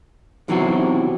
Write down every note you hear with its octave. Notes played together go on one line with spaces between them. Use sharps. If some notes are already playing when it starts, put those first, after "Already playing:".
B1 C3 E3 F#3 C4 F#4